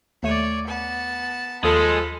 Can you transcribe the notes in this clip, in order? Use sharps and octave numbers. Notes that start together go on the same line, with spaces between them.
D#2 A3 C#5 D5 D#7
B3 A5
D#2 F3 G#3 A4 B5